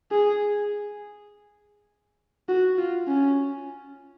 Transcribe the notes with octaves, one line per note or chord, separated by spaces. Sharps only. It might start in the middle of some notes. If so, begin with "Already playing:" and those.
G#4
F#4
F4
C#4